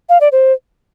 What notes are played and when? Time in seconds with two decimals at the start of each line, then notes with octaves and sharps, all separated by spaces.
0.09 F5
0.21 D5
0.32 C5